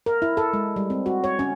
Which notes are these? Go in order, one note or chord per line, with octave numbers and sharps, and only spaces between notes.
A#4
E4
A4
G#3
G3
C4
F#4
C#5
C#4